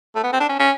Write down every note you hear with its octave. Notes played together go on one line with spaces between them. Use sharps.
A3
B3
C4
D4
C#4
C#4